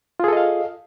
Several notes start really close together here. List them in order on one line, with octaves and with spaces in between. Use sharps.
F4 G#4 A4 D#5 F5